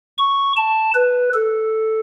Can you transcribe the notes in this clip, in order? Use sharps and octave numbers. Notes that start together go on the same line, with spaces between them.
C#6
A5
B4
A4